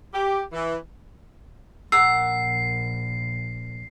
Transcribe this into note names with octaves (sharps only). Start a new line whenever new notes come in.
G4
E3
A#1 A#4 F#5 E6 C7